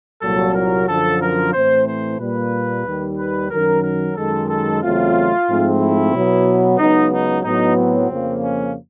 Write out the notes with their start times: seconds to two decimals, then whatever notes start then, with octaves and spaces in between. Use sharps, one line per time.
0.22 C2 A#2 F#3 A4
0.55 A#4
0.88 F#2 D3 F3 A4
1.21 A#4
1.54 A2 E3 A3 C4 C5
1.87 C5
2.19 A#2 G3 A#3 B4
2.86 D#2 D#3 G3
3.18 B4
3.51 F#2 D#3 F#3 A#4
3.83 A#4
4.16 F#2 D#3 G#3 A4
4.49 A4
4.82 E2 C#3 F#3 A3 C4 F4
5.48 G#2 F3 A3 C4
5.80 E4
6.13 B2 F#3 B3
6.79 C#2 C#3 F#3 B3 D#4
7.12 D#4
7.44 A2 F#3 B3 D#4
7.77 C4
8.10 F2 C#3 F3 A#3
8.43 C#4